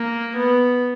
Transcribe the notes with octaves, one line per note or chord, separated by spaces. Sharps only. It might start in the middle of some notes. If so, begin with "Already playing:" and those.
Already playing: A#3
B3